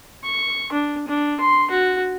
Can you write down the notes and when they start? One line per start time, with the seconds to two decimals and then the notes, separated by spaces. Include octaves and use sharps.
0.24 C#6
0.73 D4
1.08 D4
1.41 C6
1.71 F#4